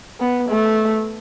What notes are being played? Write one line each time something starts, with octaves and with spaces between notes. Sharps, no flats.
B3
A3